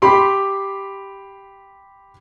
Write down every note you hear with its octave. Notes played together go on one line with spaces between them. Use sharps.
G4 B5 C6 D6